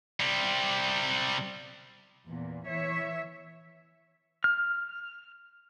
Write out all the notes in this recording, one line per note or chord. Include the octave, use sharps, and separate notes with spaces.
C3 G3
E2 A#2
E3 C#5 E5
F6